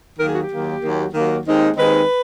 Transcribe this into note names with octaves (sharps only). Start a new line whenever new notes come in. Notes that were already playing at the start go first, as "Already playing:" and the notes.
D#2 D#3 F#3 A#3 A#4
G#4
F#4
G4
D#2 D#3 F#3 A#3
D#2 D#3 F#3 A#3
D#2 D#3 F#3 A#3
D#2 D#3 G#3 C4 D#4
D#2 D#3 G#3 C4 D#4 B4